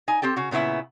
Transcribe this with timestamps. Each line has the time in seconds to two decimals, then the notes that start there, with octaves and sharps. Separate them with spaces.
0.08 D#4 G#5
0.22 C4 G4 A4 G5
0.36 C#3 F#4
0.51 A#2 C#3 B3 E4 E5